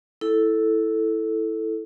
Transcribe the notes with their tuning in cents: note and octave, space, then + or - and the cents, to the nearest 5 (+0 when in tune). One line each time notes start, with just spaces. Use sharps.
E4 -5 A4 +0